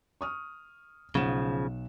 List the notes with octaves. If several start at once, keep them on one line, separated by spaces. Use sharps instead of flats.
C#6 D#6 F6
B1 C#3 F3 F#5 E7